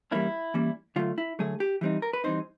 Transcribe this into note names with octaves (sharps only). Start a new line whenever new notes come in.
E3 G3 A#3 C#4 E4
E3 G3 A#3 C#4
D3 F#3 A3 F4
E4
D3 F#3 A3 G#4
G4
E3 G3 C4 D#4
A#4
B4
E3 G3 C4 D#4 C5